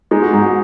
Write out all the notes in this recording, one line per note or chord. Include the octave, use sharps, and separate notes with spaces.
G#3 D#4
F#4
G#2 D#4